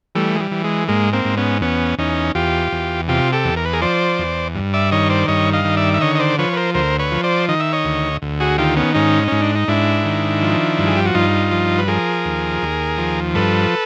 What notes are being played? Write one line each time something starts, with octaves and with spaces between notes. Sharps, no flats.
E3 G3 A3
G#3
G3
E3
G#3
G#2 G#3 A#3
A#3 C4
G#2
B3 C#4
E2 B3 C#4
E2 C#4 D#4
E2 F4 G4
E2
C3 F4 G4
G4 A4
E2
A#4
B4
G#4 A#4
F3 C5 D5
E2
G2
D5 E5
D#3 C#5 D#5
C5 D5
G2 C#5 D#5
D#5 F5
D#3
D5 E5
E5
D3 C#5 D#5
D#5
C5 D5
F3 B4 C#5
B4
A#4 C5
D2 A#4 C5
B4 C#5
F3
C5 D5
D#3 D#5
E5
C#5 D#5
D2
D2
F#4 G#4
D#3 F4 G4
B3 C#4
G#2 C#4 D#4
G#2 C#4
D4
D#4
G#2 D4 E4
D#3
F3
G2
G#4
G4
F#4
G2 D#4 F4
F3
B4
F3 G#4 A#4
D#2
D#2
F3
G2 A4 B4